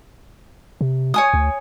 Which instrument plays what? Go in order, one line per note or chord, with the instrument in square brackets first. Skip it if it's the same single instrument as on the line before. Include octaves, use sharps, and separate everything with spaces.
[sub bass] C3
[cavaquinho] C#5 G#5 D#6
[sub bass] D2